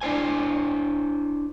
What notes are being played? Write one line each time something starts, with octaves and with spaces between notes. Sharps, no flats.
D4 E4 C5 G#5